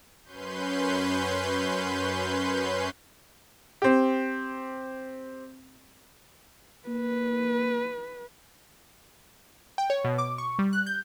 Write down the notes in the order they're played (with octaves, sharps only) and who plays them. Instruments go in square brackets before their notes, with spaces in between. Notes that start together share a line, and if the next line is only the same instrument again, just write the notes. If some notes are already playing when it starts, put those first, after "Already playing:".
[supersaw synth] F#2 C#4 B4 C6 G6
[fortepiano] C4 G4
[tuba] A#3 [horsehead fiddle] B4
[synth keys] G5
C#5
B2
D6
C#6
G3
F#6
G6